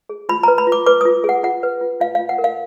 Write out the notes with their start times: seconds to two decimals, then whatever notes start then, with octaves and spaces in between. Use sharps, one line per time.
0.09 G#4
0.29 F4 B5
0.43 B4 A#5
0.58 B5
0.67 F4
0.72 D6
0.86 B4 D6
1.01 F4 D#6
1.24 G#4
1.29 F#5
1.43 F4 F#5
1.63 B4
1.81 F4
2.00 F4 F5
2.15 F4 F5
2.29 F#5
2.38 A#4
2.44 F5